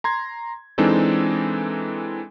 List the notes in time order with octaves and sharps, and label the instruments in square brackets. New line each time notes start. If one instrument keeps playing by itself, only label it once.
[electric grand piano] A#5 C6 G#6
E3 G#3 C4 D4 D#4 A4